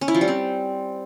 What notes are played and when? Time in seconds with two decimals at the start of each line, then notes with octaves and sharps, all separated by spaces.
0.01 C#4
0.08 E4
0.15 F3
0.21 G3
0.28 C4